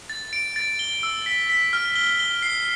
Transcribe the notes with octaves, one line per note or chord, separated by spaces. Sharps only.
A6
D7
A6
G7
E6
B6
B6
F6
G7
G7
C7